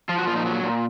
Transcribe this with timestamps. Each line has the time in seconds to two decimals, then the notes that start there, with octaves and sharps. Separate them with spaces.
0.09 F3 F4
0.18 F#4
0.27 A#2 F4
0.36 D#4
0.46 F#3
0.63 A#2